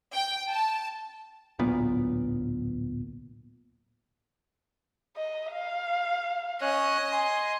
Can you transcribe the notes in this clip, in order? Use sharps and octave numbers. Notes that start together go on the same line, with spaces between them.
G5
A5
D1 B1 A#2 B3
D#5
F5
C#4 C#5 D#5 F#6
G#5 C6